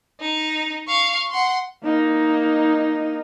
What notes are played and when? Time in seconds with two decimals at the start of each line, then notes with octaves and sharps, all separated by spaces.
0.20 D#4
0.88 F5 C#6
1.30 F#5 C6
1.84 A#3 D#4